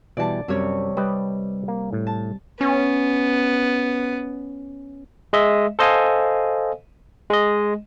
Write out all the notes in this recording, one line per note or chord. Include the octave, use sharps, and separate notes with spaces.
B2 E3 G3 D5 A5
F#2 C3 G3 C#5
G3 G4 B4 D#5
A#3
A2
A5
B3 C#4
G#3 D#5 E5
A4 C5 D#5 F5 G#5
G#3 D#5